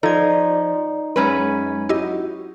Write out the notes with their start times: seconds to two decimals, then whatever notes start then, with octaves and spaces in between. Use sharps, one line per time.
0.03 F3 D#4 A4 D5 G#6
1.16 F#2 G#3 C#4 B4
1.89 E4 F#4 G4 D#5